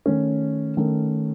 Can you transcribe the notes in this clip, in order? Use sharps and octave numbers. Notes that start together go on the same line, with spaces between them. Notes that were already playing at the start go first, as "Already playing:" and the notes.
D#3 A3 C#4
D#3 A3 C#4